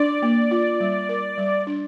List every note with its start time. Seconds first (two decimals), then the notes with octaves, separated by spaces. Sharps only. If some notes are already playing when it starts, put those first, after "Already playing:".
Already playing: D4 D5
0.22 A#3
0.51 F4
0.80 G3
1.09 A#4
1.38 G3
1.67 D4